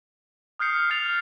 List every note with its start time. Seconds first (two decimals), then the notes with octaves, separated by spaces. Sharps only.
0.59 D#6 F6 G6 C7 C#7
0.90 F6 A6 F7